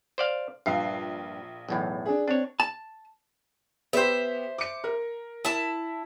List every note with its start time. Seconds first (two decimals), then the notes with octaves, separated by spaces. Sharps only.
0.18 C5 D5 F5
0.66 A#1 G2 F5 C7
1.69 B1 E2 A2
2.06 D4 G#4
2.28 C4 D4 C#5
2.60 A5
3.93 B3 G4 C5 E5
4.58 D6 C#7
4.84 A#4
5.45 E4 A5